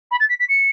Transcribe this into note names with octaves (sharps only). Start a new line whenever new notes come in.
B5
A6
B6
B6
C#7